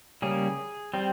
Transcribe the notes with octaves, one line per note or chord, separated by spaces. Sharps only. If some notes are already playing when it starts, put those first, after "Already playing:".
C#3 G3 A#3 C#4 G#4
G3 C4